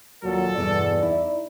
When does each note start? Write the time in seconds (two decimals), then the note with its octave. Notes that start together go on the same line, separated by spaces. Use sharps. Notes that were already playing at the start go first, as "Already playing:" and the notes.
0.24 D#2 A#2 F#3 A4
0.56 E2 G2 B2 D5
0.99 D#4 E4